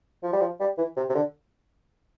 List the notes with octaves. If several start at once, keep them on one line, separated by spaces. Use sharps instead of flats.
F3
G3
F3
G3
E3
C3
C3
D3